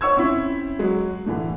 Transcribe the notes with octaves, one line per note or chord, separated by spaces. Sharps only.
C#5 C#6 E6 G#6
C4 C#4 E4
F#3 G#3
A2 D3 E3